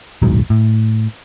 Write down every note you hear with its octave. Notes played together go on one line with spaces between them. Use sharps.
D#1 B1 G#2 F#3
A2